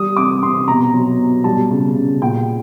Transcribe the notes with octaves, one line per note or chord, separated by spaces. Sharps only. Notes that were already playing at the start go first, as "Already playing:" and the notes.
Already playing: G3 D#6
C3 D6
C3 C6
B2 A#5
F#3
B2
G3 A5
C#3
C#3
A#2 G5